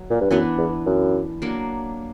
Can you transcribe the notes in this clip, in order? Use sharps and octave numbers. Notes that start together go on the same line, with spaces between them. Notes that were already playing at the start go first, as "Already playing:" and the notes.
Already playing: F#3
A#2
G2
F#2 E3 B3 D4
E2
F#2
F#3 A#3 D4